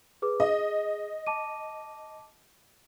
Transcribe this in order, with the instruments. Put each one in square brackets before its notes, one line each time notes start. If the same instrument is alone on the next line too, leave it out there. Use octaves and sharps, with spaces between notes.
[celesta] G#4 B4 D6
[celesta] G#4 [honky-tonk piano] D#5
[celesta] A5 D6 D#7